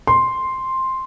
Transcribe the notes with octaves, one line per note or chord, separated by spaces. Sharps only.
C6